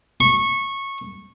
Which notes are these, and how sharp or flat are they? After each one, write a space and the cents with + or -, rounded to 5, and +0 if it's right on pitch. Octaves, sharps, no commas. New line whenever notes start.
C#6 -15